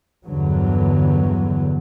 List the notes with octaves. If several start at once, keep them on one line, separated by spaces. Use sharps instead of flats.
E2 G2 D3 E3 F#3